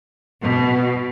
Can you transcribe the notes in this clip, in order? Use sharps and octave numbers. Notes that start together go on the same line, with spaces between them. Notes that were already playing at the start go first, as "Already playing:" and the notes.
B2